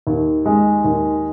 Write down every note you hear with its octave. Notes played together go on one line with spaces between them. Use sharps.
D#2
G#3
D#2